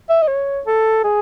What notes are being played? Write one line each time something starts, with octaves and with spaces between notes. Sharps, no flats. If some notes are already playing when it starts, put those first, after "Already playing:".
E5
D#5
C#5
A4
G#4